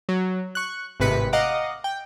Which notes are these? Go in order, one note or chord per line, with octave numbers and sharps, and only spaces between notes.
F#3
C#6 F#6
G#1 A2 C3 B4 B6 C#7
D#5 F5 F#5 A#5 D6
G5